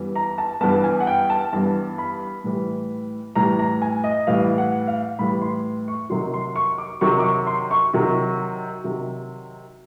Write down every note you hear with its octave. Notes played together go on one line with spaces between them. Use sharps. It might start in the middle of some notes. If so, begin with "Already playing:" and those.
Already playing: G2 E3 G3 B3
A#5
A5
G2 E3 G3 B3 A5
G#5
F#5
G5
A5
G2 E3 G3 B3 A5
B5
A2 E3 G3
A2 E3 G3 A#5
A#5
G#5
D#5
A2 E3 G3 F5
F#5
F5
A2 E3 G3 B5
C6
C#6
C3 D#3 F#3 C6
C6
C#6
D6
C3 D#3 F#3 C#6
D6
C#6
C6
C#6
C3 D#3 F#3
C3 D#3 F#3